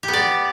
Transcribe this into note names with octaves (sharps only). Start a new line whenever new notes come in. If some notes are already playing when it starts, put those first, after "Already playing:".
G4
B3
D5